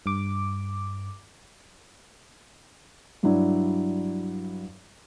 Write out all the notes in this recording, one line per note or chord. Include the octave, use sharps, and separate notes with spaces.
G2 D6
G2 F#3 D4 E4